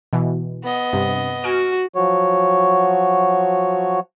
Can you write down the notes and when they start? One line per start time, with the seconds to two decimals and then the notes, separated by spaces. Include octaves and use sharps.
0.13 B2 E3
0.63 B3 D#5
0.93 G2 C3
1.44 F#4 G#5 F6 D7
1.95 F3 F#3 F#4 C#5